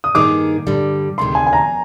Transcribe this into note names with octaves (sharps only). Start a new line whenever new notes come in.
D#6
G2 D#3 A#3 D#4 G#4 D6
G2 D3 G3
D2 C3 D#3 G#3 C6
G#5
G#5
A#5